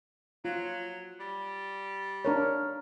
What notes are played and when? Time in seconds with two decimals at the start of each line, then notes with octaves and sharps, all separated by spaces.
0.45 F#3 F4
1.20 G3
2.25 D4 A#4 C#5